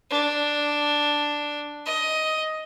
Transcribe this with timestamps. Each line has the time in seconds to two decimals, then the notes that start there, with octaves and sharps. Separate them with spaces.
0.10 D4
1.86 D#5